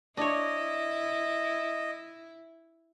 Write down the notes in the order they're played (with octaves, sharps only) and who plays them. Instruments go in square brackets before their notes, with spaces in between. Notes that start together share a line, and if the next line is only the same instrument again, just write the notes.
[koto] D4 C#5 [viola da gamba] E4 [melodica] D#5